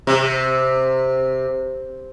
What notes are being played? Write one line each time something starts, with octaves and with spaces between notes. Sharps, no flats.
C3